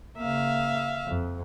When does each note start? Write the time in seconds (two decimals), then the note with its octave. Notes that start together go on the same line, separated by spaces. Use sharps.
0.18 C#3 A#3 E5 F5
1.06 F2